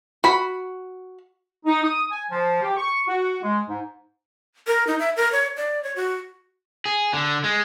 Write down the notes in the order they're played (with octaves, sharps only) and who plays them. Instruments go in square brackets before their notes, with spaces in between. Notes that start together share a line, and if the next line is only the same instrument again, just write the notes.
[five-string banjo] F#4 B5
[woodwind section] D#4
D#6
G#5
F3
G4
C#6
F#4
G#3
G#2
[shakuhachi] A#4
D#4
E5
A#4
C#5
D5
C#5
F#4
[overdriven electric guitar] G#4
D3
G#3